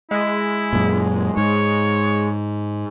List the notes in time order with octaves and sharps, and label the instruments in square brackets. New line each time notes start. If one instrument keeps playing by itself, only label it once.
[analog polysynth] G#3 [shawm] E4
[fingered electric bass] F#2 A#2
[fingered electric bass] G#2 [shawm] C#5